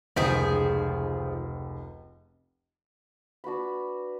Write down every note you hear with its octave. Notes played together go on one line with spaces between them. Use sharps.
F1 C#2 D#3 F3 G#4 B6
D4 F#4 B4 B5